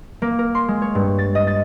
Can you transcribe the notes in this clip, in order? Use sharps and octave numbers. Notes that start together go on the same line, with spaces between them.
A#3
A#4
C6
G#3
C#5
G2
A6
D#5
A6